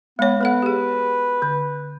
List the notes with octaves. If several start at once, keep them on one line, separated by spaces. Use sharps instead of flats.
G#3 B3 C#5
B3 A4 B4 F#5
G4 G#4
D3